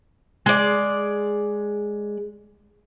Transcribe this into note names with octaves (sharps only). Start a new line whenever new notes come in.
G#3 D5